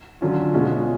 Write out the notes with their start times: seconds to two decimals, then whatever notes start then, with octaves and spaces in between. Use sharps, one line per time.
0.21 D3 F#3 C#4 F4
0.53 B2 G#3 C#4 F4